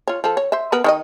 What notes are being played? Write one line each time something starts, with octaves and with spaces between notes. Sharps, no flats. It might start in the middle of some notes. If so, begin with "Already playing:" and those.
F4 C#5
F3 A4
C#5
C5 E5
B3 A#4 B4
D#3 E4 D#5